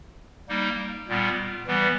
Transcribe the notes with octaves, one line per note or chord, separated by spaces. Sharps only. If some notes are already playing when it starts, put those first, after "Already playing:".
G3 A#3 D#4
A#2 G3 B3
E3 G3 B3